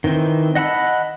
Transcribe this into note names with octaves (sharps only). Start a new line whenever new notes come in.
D#3 E3 C4
D#5 F#5 A5 B5 E6